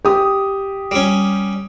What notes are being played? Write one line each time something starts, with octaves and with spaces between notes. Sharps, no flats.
G4 D#6
G3 C#4